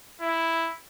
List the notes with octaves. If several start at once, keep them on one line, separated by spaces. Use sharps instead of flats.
E4